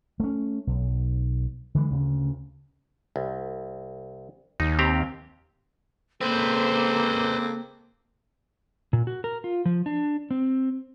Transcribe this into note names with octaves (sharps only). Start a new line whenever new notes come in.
A3 C#4
B1
D3 E3 G#3
D2 C#3
C2
D#2 D#4
C4 G4 A#5
C#3 G#3 A#3 C4 A4 B4 C5
A#2
F#4
A#4
F4
F3
D4
C4